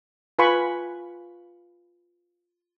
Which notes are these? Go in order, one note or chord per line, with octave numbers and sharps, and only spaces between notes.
F4 B4 F5 G#5 B5 C#6